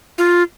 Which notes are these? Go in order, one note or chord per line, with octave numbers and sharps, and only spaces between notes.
F4